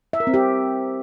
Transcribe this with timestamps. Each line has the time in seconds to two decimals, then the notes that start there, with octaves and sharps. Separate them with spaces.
0.13 E5
0.20 A#4
0.27 C4
0.34 G4